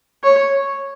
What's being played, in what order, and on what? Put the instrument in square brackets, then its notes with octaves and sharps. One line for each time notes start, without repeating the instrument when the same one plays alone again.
[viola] C#5